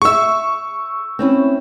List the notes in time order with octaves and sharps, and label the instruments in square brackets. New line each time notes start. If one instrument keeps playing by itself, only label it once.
[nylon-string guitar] G#4 E5 [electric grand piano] C#6 E6
[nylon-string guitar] C4 C#4 E4